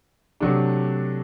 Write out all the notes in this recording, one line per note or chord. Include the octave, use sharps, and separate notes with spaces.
C3 F#3 A3 D4